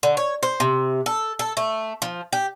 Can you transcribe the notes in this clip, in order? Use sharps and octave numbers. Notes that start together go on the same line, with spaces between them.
D3
C#5
C5
C3
A4
A4
A3
F3
G4